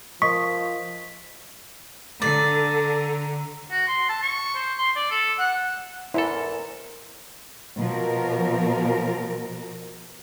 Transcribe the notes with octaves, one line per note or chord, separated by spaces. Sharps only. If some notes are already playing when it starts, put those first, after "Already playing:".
F3 A#4 D#5 C#6 D#6 B6
D3 A4 D5 A#5
F#4
C6
A5
C#6
C5
C6
D5
A4
F#5
E2 G#2 E4 A4 A#4 C5 A#5
B2 F3 A#4